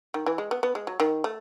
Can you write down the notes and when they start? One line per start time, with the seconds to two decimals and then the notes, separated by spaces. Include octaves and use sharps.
0.14 D#3
0.26 E3
0.38 G#3
0.51 B3
0.63 B3
0.75 G#3
0.87 F#3
1.00 D#3
1.24 A3